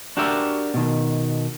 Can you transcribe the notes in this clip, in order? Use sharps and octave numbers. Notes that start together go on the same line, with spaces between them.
D4 F#4 G4 A#4 E5
B2 D#3